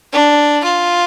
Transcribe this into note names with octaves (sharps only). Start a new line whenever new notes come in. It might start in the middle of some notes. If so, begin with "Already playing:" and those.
D4
F4